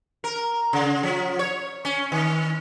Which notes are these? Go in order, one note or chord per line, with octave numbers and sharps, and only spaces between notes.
A#4
C#3
F3
C#5
C#4
D#3